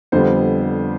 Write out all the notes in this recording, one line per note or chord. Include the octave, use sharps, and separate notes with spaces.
F2 D3 G3 B3 C5